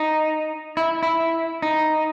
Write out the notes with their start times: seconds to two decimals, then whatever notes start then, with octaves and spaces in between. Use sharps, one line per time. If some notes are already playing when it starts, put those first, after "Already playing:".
Already playing: D#4
0.77 E4
1.03 E4
1.62 D#4